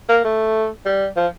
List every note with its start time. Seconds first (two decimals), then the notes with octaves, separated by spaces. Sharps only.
0.09 A#3
0.24 A3
0.85 G3
1.16 F3